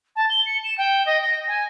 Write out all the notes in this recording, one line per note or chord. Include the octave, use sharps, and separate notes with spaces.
A5
G7
C#7
E7
G5
D#5
A#6
G#5